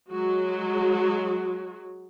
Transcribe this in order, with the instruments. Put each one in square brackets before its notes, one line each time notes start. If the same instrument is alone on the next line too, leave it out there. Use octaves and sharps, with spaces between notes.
[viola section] F#3 G#3 F#4